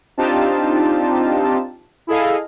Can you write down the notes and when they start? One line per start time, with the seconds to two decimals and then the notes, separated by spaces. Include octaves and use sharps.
0.17 C4 D4 D#4 F4 G4 A5
2.07 E4 G#4 A4 D#5 F5